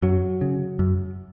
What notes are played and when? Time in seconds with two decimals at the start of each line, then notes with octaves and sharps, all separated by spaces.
0.02 F#2 F#3
0.41 C#3
0.79 F#2